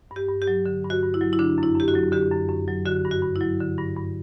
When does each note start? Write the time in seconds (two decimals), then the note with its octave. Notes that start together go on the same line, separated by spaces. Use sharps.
0.11 G2
0.16 G4
0.28 G2
0.42 G4
0.47 F#3
0.66 D3
0.84 G2
0.90 F#4
1.03 G2
1.14 E4
1.21 F#3
1.33 E4
1.39 D3 D4
1.58 F#2
1.63 E4
1.75 F#2 G4
1.88 F#4
1.95 F#3
2.12 D3 G4
2.31 F#2
2.49 F#2
2.68 F#3
2.85 D3 F#4
3.05 G2
3.11 F#4
3.22 G2
3.36 F#3 E4
3.60 D3
3.78 G2
3.96 G2